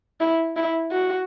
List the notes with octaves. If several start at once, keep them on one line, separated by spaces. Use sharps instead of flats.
E4
E4
F#4